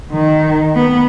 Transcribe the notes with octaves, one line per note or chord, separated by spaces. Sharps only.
D#3
B3